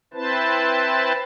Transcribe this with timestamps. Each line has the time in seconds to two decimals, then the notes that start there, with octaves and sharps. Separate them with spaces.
0.14 C4 E4 B4 C5 A5